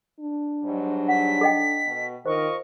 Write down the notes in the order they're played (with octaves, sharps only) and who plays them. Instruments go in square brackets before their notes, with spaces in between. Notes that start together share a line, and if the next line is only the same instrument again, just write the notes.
[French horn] D4
[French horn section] G#2 F#3 G3
[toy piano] F#5 [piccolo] B6
[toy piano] A4 D#5 G5
[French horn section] B2
[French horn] D#3 [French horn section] F4 A#4 D#5 [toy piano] C5 [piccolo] C#6